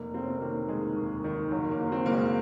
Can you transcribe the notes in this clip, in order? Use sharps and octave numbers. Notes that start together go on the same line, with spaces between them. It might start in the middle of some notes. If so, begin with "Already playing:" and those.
Already playing: F1 A#3
F1 C4
C#4
C4
D#3 A#3
D#3 G#3
D#2
D#3
F#1 F#3
A#3
F#1
C4
F#1 A#3
G#3